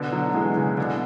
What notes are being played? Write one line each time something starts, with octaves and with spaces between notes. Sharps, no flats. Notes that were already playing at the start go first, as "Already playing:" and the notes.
Already playing: B2 D3
D3 F#3
E3 G#3
C#3
B2 D3